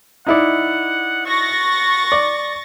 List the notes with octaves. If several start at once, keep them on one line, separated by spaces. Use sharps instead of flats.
D#4 E4 D5 F#5
F#4 C#6 A6 A#6
D5